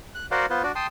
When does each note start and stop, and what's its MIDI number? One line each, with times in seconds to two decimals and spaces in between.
0.15 0.26 90
0.31 0.46 66
0.31 0.46 70
0.31 0.46 72
0.31 0.46 74
0.31 0.46 77
0.31 0.46 78
0.50 0.63 59
0.50 0.63 65
0.50 0.63 71
0.50 0.63 72
0.63 0.72 62
0.63 0.72 66
0.63 0.72 74
0.75 0.87 79
0.75 0.87 81
0.75 0.87 84
0.75 0.87 87